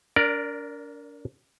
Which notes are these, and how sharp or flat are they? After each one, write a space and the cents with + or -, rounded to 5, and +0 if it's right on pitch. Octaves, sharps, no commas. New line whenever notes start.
D4 -35 A#4 +0 D5 +0